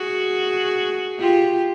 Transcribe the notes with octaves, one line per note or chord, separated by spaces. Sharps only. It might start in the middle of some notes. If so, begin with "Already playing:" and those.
Already playing: F#4 G#4
F4 G4